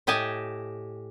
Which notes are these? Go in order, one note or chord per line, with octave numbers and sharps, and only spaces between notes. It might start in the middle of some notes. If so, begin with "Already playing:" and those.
A2 G4 D#5 G#5 A5